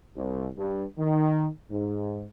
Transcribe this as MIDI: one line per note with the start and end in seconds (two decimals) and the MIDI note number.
0.16 0.48 36
0.58 0.85 43
0.98 1.47 51
1.71 2.25 44